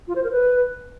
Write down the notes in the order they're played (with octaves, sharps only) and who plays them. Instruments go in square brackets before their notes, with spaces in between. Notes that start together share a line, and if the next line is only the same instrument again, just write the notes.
[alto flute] F4
C5
A#4
B4